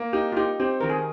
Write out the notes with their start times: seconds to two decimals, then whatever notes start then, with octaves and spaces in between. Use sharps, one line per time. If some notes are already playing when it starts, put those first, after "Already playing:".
Already playing: A#3
0.13 D#4 G4
0.32 F4
0.36 D#4 G4
0.60 C4 G4
0.81 D#3 A#4
0.90 G#4